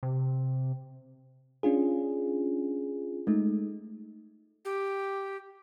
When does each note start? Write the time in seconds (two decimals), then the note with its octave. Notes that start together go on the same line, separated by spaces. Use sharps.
0.03 C3
1.63 C#4 D4 F4 G#4
3.27 G#3 A3 D#4
4.65 G4